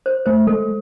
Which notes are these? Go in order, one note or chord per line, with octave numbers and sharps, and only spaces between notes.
C5
A3 C5
G#3 A4